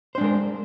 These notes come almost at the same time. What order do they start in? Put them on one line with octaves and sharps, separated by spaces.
C5 D4 G#3 A#4